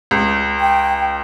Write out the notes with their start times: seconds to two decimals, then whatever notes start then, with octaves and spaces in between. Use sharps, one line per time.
0.11 C#2
0.61 G5